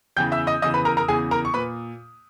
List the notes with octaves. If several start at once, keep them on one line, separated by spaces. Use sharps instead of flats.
E2 C#3 E3 G5 G6
E5 E6
D#5 D#6
E2 C#3 E3 D#5 D#6
B4 B5
A#4 A#5
A#4 A#5
E2 C#3 E3 G#4 G#5
A#4 A#5
C#6
A#2 B4 B5